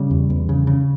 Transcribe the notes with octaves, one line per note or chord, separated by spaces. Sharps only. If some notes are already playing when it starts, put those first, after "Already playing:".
Already playing: C#3 G3
E2
E2
C#3
C#3